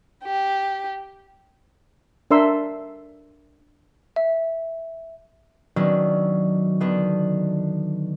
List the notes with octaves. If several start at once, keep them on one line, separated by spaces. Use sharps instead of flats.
G4
D4 A#4 E5 C6 E6
E5
D#3 F#3 B3 C#4 D4
D3 D#3 B3 D4